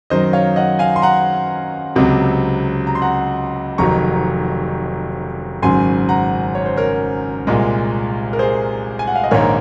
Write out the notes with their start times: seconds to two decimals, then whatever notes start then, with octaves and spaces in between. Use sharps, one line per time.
0.10 F#2 D#3 F#3 C5 D#5
0.33 C#5 F5
0.56 D#5 F#5
0.79 F5 G#5
0.96 C6
1.02 F#5 A#5
1.95 C#2 C3 F#3 C4
2.87 A#5
2.95 C6
3.02 F#5 A#5
3.78 F1 F2 D#3 F#3 A#5 C#6
5.62 G#1 F#2 C#3 F#3 G#5 C6
6.09 F#5 A#5
6.55 C#5
6.66 C5
6.77 A#4 C#5
7.47 C2 A#2 G#3
8.33 A#4
8.39 G#4 C5
8.99 G#5
9.07 F#5
9.16 F5
9.24 D#5
9.31 A#1 G#2 D#3 A#3 A#4 C#5